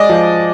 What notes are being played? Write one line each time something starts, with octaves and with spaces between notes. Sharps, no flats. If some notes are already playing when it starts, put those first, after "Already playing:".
Already playing: G#3 D5 D#5
F3